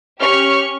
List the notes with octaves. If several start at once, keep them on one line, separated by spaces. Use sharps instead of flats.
C#4 G4 C#6 F6